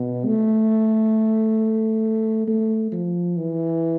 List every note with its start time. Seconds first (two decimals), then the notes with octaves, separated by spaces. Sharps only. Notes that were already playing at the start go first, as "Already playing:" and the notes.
Already playing: B2
0.26 A3
2.48 A3
2.92 F3
3.36 E3